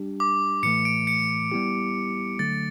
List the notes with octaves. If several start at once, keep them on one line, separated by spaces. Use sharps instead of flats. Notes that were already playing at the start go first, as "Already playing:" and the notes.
Already playing: G3 D4 G4
D6
A2 E3 A3 C#7
D7
C#7
G3 B3 E4 G4
D3 F#3 A3 A6